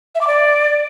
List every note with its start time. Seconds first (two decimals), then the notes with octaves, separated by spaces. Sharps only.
0.15 E5
0.21 D6
0.27 D5